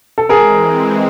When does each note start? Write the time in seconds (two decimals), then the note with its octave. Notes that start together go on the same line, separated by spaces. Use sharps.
0.18 A4
0.29 E3 G#3 C4 G#4 A#4